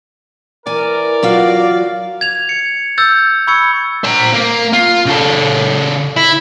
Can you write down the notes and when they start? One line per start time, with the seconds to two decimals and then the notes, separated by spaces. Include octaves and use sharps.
0.67 E3 A#4 D5 G#5
1.23 F#3 F4 F#4 F5
2.21 G#6 F7
2.49 G#6 C#7
2.98 E6 G6 A6
3.47 B5 C#6 E6 G#6 C#7
4.04 C5 A#5
4.33 A#3
4.73 F4
5.06 C#3 A4
6.16 E4